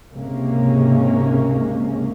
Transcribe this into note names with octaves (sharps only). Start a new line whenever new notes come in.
C#2 G#2 C3 G#3 A#3 C#4